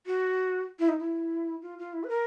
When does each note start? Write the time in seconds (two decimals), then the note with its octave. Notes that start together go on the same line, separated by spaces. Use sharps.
0.06 F#4
0.79 E4
0.89 D#4
0.99 E4
1.62 F4
1.79 F4
1.93 E4
2.04 B4
2.10 A#4